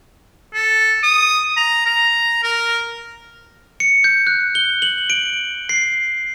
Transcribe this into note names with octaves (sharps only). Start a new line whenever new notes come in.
A4
D#6
A#5
A#5
A#4
C#7
G6
F#6
G7
F#7
D7
C7